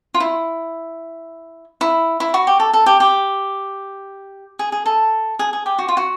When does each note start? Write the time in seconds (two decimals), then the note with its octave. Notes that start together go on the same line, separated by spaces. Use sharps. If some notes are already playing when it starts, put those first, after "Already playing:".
0.14 F4
0.20 E4
1.81 E4
2.20 E4
2.34 F#4
2.47 G4
2.60 A4
2.73 A4
2.86 G4
3.00 G4
4.59 G#4
4.72 G#4
4.86 A4
5.39 G#4
5.53 G#4
5.66 G4
5.79 F#4
5.88 F4
5.97 F#4